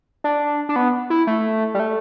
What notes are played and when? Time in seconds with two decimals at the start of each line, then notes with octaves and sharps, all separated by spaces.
0.24 D4
0.69 D4
0.76 B3
1.10 E4
1.27 A3
1.75 G3
1.80 A3